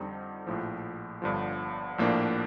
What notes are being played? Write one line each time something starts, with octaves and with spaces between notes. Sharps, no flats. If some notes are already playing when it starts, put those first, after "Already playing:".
Already playing: F2 D3 G3 C4 D#4
A#1 A2 F3
G1 G2 D3 F3
A#1 A2 F3 A#3 D4